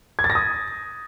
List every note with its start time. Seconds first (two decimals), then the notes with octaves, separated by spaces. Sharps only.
0.19 G#6
0.24 A6
0.30 A#6
0.35 D#6